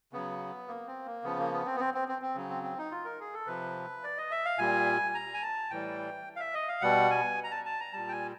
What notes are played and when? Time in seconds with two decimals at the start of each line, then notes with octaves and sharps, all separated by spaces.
0.13 C#3 F#3 B3
0.68 A#3
0.87 C4
1.06 A#3
1.24 C#3 F3 B3
1.38 A#3
1.52 B3
1.66 C4
1.76 B3
1.80 C4
1.94 C4
2.08 C4
2.22 C4
2.35 C#3 F#3
2.49 C4
2.64 C4
2.78 D#4
2.91 F4
3.05 A#4
3.20 G#4
3.34 A4
3.47 C3 F3 B4
4.04 D5
4.18 D#5
4.31 E5
4.45 F5
4.58 A#2 G3 G#5
5.15 A#5
5.34 G#5
5.42 A5
5.71 A2 E3 G3 G5
6.36 F5
6.40 E5
6.54 D#5
6.68 F5
6.81 B2 G3 F#5
7.10 G#5
7.44 A#5
7.51 A5
7.66 A5
7.80 A#5
7.93 A#2 G3 A5
8.08 G5
8.12 G#5